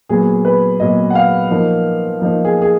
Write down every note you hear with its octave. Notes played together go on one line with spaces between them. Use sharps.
A#2 F#3 B3 G#4
B4
A#2 F#3 B3 D#5
F#5
F5
F3 A#3 D#4
F3 A#3 D#4
G#4
G#4